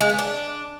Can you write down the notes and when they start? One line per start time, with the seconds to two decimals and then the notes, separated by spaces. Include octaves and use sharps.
0.01 G#3
0.10 B3
0.19 D4